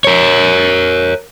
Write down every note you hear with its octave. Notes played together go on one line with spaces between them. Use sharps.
A#4 C#5